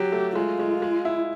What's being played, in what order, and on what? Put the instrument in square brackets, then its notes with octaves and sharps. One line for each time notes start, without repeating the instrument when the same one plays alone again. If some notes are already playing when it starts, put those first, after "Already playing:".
Already playing: [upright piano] F#3 [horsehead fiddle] G4
[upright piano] A3
[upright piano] G#3 [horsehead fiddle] F4
[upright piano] G#3
G#3
E4